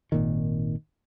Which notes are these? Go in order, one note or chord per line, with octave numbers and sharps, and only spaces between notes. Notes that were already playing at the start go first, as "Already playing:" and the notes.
G#1 A#2 D#3